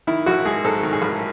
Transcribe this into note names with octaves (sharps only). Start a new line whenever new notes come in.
D#3 E4
A1 F#4
G#3 G#4
G#2 A4
D#3
G#4
A1